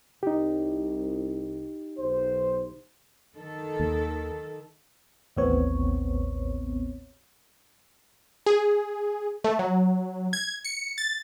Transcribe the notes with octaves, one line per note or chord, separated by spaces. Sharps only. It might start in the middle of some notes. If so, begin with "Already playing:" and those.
C2 D#4 G4
B1 C5
D#3 A4
D#2
A1 D#2 A2 B3 C4 C#5
G#4
A3
F#3
G#6
C#7
A6